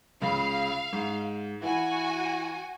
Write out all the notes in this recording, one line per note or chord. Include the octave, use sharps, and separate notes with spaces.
C#2 C#3 F5
G#2
E3 F#4 G#5